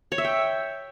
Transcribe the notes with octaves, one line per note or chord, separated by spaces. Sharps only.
C#5
E5
G5